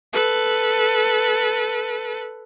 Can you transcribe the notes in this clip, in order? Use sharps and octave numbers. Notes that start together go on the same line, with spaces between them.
A4 B4